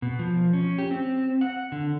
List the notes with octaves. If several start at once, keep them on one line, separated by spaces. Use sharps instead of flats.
B2
F3
C#4
G4
C4
F#5
D3